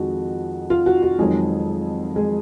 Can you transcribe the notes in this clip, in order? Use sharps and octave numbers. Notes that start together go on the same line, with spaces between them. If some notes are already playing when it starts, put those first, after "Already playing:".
Already playing: F2 D#3 G#3 F#4
F4
F#4
F#4
F2 D#3 F#3 G#3 G#4
G#3 G#4